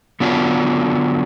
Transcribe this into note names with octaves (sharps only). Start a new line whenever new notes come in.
D3 F#3 B3 D4 F4